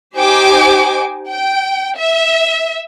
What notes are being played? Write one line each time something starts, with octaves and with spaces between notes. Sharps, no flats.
D#4 G4 C5 G5 G#5 D6
G5
E5